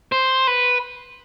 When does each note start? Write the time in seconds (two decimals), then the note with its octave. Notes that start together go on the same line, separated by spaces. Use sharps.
0.12 C5
0.47 B4